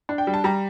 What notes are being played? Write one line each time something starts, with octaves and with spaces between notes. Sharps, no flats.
D4
G5
G3
A5
G3 A#5